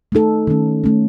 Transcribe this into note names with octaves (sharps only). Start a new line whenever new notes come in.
A3 D#4 A4
D#3 A3 C#4
D#3 A3 C#4